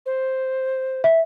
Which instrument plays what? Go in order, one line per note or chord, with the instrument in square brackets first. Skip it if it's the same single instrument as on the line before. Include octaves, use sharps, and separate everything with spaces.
[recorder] C5
[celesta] E5